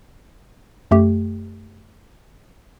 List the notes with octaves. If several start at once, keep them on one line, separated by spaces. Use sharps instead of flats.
F#2 A3 G4